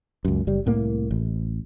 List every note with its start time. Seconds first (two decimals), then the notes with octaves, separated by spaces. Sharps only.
0.25 C#2 F#2
0.47 F#1 G3
0.66 C2 A2 A#3
1.11 A1